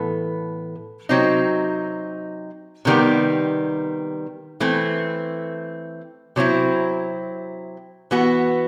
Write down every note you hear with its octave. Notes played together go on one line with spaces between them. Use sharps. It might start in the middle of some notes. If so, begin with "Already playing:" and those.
Already playing: A2 E3 B3 A4
C3 F#3 C4 D#4
C3 D#3 G3 B3
E3 A3 C4
C3 F#3 C4 E4
E3 B3 F#4